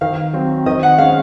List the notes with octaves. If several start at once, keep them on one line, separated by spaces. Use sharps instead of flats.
D#3 F5
F#3 C4
D#3 D#5
F#5
G#3 C#4 F5